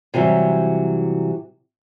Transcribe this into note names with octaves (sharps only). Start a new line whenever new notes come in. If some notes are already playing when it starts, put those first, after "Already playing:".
C3 E3 F#3 G3